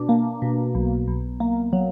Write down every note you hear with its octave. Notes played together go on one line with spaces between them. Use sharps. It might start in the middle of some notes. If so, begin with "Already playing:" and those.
Already playing: B2 D4
A#3
B2
B1
B1
A#3
F#3